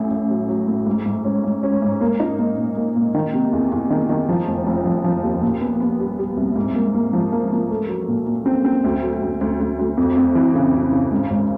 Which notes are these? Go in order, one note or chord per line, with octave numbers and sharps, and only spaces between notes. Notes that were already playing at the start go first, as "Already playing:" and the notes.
Already playing: A1 A2
A1
F#3
F#3
A2
G#2
G#2
C#4
G#2
C#4
G#2
A#3
D#4
A#3
A#2
A#3
A#2
D#3
C3
E2
E2
D#3
D#3
F3
F1
F1
F3
F3
D#2
A#2
B3
B3
G3
G3
C2
G#2
A#3
A#3
F3
A#3
A#3
A3
F#3
A#2
A#2
C4
C4
D2
F#3
D2
D2
D2
D2
F2
F2
E3
C#3
C#3
C#3
G#2
G#1